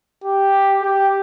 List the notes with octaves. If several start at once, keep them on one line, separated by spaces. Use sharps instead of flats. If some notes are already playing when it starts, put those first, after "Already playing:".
G4
G4